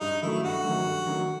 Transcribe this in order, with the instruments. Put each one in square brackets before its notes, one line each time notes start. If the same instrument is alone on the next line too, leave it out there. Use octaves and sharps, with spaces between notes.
[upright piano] G2 [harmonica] D#4
[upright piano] D#3 F#3 A3 [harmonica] E4
[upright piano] G2 [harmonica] F#4
[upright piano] D#3 F#3 A3
G2
D#3 F#3 A3